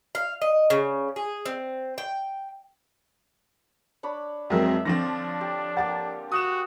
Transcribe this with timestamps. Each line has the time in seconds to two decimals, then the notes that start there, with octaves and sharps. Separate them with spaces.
0.15 F5
0.42 D#5
0.70 C#3
1.16 G#4
1.46 C4
1.98 G5
4.03 D4 C#5 B5
4.50 F2 F#3 G#3 C4 A#4 E5
4.85 D3 F3 C4 D4 C#5 F5 D6 A#6
5.41 G4
5.77 A#3 G4 A#4 F#5 A6
6.32 F#4 D#6 F#6 E7